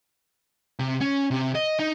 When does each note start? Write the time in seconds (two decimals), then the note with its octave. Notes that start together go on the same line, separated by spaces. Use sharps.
0.79 C3
1.01 C#4
1.31 C3
1.55 D#5
1.79 D#4